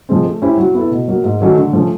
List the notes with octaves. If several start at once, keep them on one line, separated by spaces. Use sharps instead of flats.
F3 G#3 C4
A3
C#4 E4 G4 C5
F#3
B3 E4 A4
B2
F#3 A#3
G#2
D#3 F#3 A3 C#4
D3
F3 A3 C#4